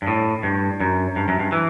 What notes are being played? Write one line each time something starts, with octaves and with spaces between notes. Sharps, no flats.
G2
A2
G2
F#2
G2
F#2
G2
E3